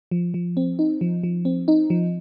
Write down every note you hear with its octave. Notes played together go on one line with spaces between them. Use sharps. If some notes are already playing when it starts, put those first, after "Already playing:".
F3
F3
C4
D#4
F3
F3
C4
D#4
F3